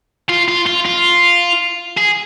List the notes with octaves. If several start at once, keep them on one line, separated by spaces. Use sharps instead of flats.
F4
F4
F4
F4
G#4